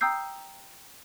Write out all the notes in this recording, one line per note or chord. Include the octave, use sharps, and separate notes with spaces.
G5 A#5 D#6 E6 G6 C7